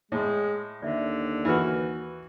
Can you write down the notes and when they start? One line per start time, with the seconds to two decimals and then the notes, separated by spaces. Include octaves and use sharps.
0.12 A2 G#3
0.83 D#2 D3 D5 E5
1.45 E3 F#4 B4 B5